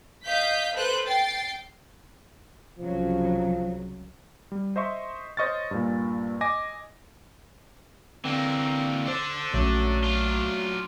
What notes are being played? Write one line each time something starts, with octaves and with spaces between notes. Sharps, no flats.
D#5 F5 G6 B6
A4 B4 C5 F#6 G6
G5 A6 C7
C2 C#3 F3 F#3
G3
C5 D#5 E5 C6 C#6
C5 C#5 D#5 C#6 F6 A6
G2 A#2
D#5 G#5 D6 A#6
D3 E3 A#3 C4
D4 A4 C5
A#1 F#3 A3 C#4
D4 F4